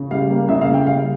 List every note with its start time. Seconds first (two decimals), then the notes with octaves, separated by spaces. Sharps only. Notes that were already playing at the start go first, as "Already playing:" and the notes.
Already playing: C#3
0.11 G3 F5
0.30 A#3
0.49 C#3 E5
0.61 F5
0.68 C#3
0.74 G5
0.87 G3 F5